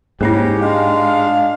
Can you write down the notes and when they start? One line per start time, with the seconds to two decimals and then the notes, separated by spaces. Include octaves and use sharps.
0.21 G#2 A#3 C#4 D#4 E4 G4
0.60 G#3 D4 F4 F5